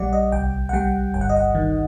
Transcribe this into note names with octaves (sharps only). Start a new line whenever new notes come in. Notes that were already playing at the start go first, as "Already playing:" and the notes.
Already playing: A#1 G3 D5 F#5
D#5
C2 G5
F#5
G3 G5
G1 G5
F#5
D#5
F#5
D#3